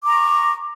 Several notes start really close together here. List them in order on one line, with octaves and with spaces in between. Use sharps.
D6 A#5 C#6